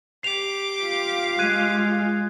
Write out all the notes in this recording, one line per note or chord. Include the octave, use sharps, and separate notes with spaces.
G4 D6 C7 F7
F4 F5
G#3 F#6 G#6 D#7